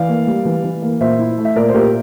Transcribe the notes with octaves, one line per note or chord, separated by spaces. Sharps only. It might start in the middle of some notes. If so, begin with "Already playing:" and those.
Already playing: E3 D5 F5
A#3
G3
E3
E3
A#3
A#2 C5 E5
E4
A3
E5
A#2 A#4 D5
C5
A#2 G4 A#4